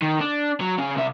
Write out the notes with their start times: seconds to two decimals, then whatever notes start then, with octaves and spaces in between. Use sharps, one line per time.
0.02 D#3
0.20 D4
0.61 F#3
0.78 C#3 C#4
0.96 C2 E5